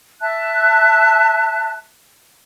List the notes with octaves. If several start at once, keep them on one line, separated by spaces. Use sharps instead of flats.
E5 A5 F#6